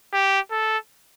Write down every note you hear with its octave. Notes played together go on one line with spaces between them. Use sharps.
G4
A4